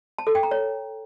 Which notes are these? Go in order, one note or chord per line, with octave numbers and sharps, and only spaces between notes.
A5
A4
G5
A#5
C#5